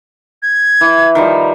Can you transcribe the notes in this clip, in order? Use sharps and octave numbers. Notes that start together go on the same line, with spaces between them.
G#6
E3
D#3 F3 G3